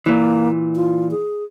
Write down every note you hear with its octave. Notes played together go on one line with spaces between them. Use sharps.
A#2 E3 A#3
F4
G#4